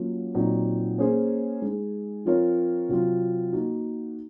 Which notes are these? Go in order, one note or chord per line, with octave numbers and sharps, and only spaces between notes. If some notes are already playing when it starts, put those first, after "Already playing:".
Already playing: F#3 A#3 C#4 F4
A#2 F#3 C4 D#4
A#3 C#4 G#4 C5
G#3 D#4 G#4
F3 C4 F4 A#4 C#5
C3 F#3 C4 F4
A#3 D#4 F#4